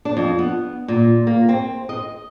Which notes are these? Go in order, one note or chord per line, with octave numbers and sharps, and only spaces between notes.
D4
F2
B3
A#2
A#3
C4
D#5